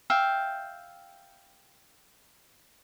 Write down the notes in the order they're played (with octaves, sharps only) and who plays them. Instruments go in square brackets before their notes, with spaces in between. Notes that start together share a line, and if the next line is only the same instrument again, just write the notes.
[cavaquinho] E5 F5 G5